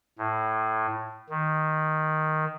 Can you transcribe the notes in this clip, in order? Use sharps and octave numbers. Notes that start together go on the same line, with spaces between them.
A2
D#3